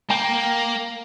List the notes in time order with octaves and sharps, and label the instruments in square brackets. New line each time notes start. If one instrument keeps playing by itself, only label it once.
[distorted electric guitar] A#3 [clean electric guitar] G5